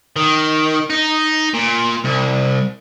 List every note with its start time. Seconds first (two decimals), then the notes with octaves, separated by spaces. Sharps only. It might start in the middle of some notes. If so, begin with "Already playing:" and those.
0.16 D#3
0.90 D#4
1.54 A#2
2.05 C2